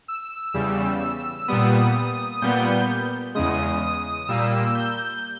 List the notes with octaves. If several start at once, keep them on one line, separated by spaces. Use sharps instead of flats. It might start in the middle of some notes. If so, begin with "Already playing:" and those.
E6
E2 C#3 G3
A#2 G3 B3 D#6
A#2 G3 B3 G6
E2 C#3 G#3 D#6
D#6
A#2 G3 A#3 E6
G6